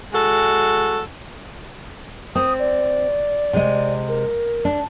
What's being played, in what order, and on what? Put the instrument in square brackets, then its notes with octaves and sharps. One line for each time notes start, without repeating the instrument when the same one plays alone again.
[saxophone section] G#3 F#4 A4
[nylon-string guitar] C4 [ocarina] D#6
[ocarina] D5
[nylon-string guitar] C3 G#3
[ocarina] A#4
[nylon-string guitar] D4